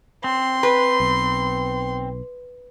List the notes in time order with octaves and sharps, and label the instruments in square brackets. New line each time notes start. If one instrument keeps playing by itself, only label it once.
[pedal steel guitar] C4 [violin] C6
[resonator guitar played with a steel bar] B4
[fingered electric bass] B1